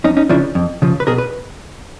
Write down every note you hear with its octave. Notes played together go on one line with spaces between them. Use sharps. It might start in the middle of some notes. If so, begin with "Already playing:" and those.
F2 C#4 D#4
C#4 D#4
C#3 F3 D4 E4
F2
C#3 F3
B4
B2 G#4 A#4
B4